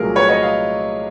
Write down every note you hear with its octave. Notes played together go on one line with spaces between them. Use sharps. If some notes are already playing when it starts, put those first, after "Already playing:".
Already playing: C2 A#2 F#3 A3 G#4 A#4
B4 C#5
C#5 D#5
D#5 F5